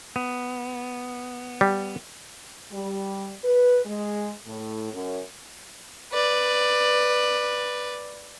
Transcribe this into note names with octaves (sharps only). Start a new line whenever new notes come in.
B3
G3
G3
B4
G#3
A2
F#2
B4 D5